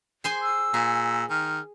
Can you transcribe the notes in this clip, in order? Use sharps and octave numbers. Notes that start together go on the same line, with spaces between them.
G#4 C5 G#5
E6
A#2 G#4
D#3 F6